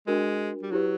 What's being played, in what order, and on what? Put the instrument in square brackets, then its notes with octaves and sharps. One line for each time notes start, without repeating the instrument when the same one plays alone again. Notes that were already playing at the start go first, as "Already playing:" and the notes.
[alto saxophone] G#3 [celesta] D4 F#4 A#4
[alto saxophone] G3
[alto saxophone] F#3 [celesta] E4 G4 B4